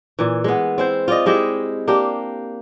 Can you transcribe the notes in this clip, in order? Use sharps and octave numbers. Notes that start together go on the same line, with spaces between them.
A#2 E3
G#3 B3
C4 E4 C5
F4 D5 D#5
G#3 E4 G4 D#5
A#3 D4 G4